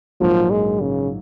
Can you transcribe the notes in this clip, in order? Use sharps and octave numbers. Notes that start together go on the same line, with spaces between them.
A#1 G#2 F3 F#3 A#3 D#4
G#3
C#3